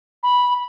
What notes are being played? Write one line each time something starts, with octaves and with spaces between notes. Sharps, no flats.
B5